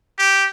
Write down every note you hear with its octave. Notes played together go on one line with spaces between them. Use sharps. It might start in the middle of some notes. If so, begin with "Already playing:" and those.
G4